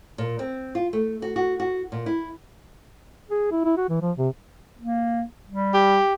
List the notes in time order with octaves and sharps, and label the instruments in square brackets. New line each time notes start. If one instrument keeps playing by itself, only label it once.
[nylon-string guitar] A#2
C4
F4
A3
F#4
F#4
F#4
A#2
E4
[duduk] G#4
E4
E4
F#4
E3
F3
C3
[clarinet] A#3
G3
[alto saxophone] G4